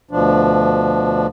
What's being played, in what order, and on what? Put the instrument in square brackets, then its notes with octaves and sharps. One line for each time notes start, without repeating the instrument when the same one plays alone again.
[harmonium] D2 B2 F3 D4